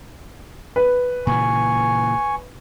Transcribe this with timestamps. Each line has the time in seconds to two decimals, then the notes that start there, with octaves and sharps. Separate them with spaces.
0.76 B4
1.27 A#2 C#3 E3 G#5 C#6